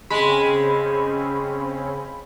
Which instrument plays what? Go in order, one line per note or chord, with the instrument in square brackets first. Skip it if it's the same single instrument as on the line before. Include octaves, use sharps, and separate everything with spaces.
[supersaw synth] C#3 C4 C#4 [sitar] G#3 [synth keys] B5